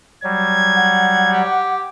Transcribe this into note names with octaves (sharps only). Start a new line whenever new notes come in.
F#3 G3 G#6
F#5
G4